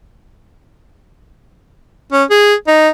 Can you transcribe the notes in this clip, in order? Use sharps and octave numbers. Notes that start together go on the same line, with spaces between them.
C#4
G#4
D#4